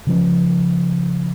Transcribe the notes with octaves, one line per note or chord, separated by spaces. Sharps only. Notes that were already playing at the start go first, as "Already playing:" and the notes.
C#3 F3 C#4